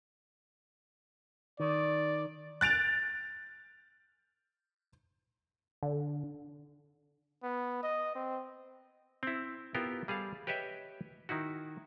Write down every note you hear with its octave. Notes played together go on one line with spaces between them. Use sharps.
D#3 D5
F#6 A6 D7 F7
D3
B3
D#5
C4
C4 E4
B3 E4 F4 G4 A#4 G5
G3 G#4 A4 F5
G4 B4 C#5 D#5 E5 G5
D#3 D#4 E4 F#4